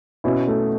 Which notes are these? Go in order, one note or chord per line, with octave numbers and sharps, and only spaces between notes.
B2 C#4 E4
A3